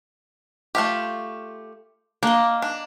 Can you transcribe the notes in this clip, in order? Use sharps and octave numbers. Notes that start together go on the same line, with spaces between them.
A3 F4 G4
A#3 D4 D#5
D4